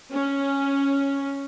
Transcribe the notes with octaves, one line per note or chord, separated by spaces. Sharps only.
C#4